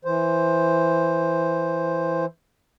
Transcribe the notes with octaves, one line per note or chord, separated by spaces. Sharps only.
E3 C5